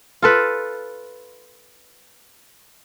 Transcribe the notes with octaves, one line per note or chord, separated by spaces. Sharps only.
F4 A4 B4